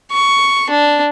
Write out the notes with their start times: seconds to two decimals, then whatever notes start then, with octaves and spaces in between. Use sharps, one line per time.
0.12 C#6
0.70 D4